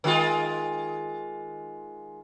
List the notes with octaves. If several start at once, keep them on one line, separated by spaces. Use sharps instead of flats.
D#3 G#3 F4